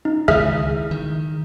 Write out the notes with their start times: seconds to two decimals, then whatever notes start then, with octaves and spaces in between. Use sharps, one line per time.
0.05 D#4
0.28 C#2 D#3 E3 G#4 E5 F6
0.91 D#3